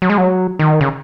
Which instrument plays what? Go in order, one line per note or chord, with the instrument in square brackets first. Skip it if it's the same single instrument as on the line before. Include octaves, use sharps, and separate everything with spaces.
[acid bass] F#3
G#3
F#3
D#3
C#3